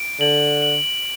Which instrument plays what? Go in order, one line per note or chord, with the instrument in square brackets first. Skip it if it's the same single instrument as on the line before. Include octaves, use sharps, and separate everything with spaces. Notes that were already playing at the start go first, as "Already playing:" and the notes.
Already playing: [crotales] D7
[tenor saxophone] D3 [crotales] F#7
[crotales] F#7